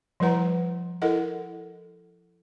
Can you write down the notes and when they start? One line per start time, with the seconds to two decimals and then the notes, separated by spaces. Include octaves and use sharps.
0.20 F3 G3 E4 B4 F#5 A#5
1.02 E4 A4 A#4 D#5 F#5